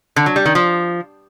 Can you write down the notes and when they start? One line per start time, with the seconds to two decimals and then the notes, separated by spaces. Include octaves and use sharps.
0.16 D3
0.26 F#3
0.36 G3
0.46 D#3
0.55 F3